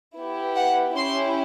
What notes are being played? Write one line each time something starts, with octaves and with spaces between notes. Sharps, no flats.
B3 E4 G4
F#5
C#4 E4 G4 C6